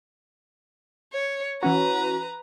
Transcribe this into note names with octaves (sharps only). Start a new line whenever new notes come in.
C#5
E3 C#4 F#4 B4 A#5